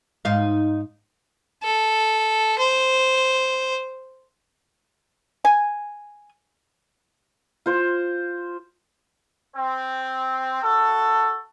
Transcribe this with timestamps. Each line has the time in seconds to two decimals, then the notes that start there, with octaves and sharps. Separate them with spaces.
0.25 G#2 D#4 F5
1.63 A4
2.59 C5
5.45 G#5
7.66 F4 C5
9.55 C4
10.63 F#4 A4